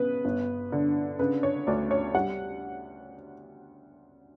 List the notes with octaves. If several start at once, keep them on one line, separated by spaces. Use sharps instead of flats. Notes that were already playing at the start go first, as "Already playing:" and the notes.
Already playing: C#3 B3 B4
G1
D3
C#3 B4
C#5
D2 D5
C#5
G3 F#5